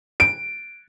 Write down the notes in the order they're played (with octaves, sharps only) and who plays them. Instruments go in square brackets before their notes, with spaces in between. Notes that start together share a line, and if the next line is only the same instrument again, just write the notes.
[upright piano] D7